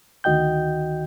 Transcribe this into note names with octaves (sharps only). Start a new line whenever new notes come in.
D2 D#3 F#4 D#5 G5 G6